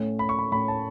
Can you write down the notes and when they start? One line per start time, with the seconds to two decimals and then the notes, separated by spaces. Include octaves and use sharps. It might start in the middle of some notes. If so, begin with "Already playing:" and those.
Already playing: A2 A3 C#4
0.19 B5
0.29 C#6
0.38 B5
0.52 A2 A3 C#4 B5
0.68 A5